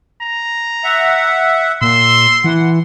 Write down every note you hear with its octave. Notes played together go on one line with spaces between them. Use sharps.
A#5
E5 F#5
A#2 C6 E6
E3 F#5